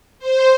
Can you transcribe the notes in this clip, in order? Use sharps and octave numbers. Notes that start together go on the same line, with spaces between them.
C5